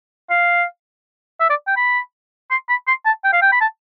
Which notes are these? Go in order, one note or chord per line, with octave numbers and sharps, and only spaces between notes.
F5
E5
D5
G5
B5
C6
B5
C6
A5
G5
F5
G5
B5
A5